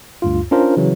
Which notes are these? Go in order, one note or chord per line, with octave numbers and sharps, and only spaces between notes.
D2 G2 F4
C#4 D4 F4 A#4 C5
C#3 E3 F#3